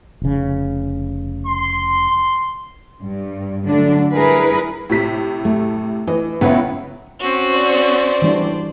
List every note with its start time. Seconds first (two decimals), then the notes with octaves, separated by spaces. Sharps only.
0.22 F1 C#3
1.47 C6
3.02 G2
3.67 D3 F#3 A3 D4
4.14 G3 E4 G#4 A#4 B4
4.89 A2 C3 B6
5.45 A3
6.07 E3 D#5
6.41 C#2 B3 C#4 E4 B4
7.19 C4 C#4 F#4
7.53 C5 D5
8.22 E3 G3 D4